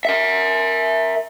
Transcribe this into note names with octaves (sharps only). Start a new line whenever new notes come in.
A#4 E5